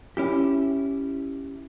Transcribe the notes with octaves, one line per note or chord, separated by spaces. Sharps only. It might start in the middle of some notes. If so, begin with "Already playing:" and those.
C#4 E4 G4